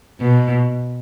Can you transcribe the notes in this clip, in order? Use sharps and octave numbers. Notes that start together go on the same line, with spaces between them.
B2